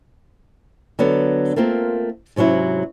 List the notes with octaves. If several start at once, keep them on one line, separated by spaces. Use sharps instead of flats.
D3 F#3 B3
A3 A#3 C4 F4 A#4
G#2 C3 F#3 C#4 E4